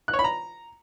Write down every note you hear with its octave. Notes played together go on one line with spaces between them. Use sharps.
F#6
C#5
B5
A#5